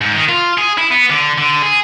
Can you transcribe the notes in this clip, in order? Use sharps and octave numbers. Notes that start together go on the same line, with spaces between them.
G#2
D#3
F4
G#4
E4
B3
D3
D3
G#4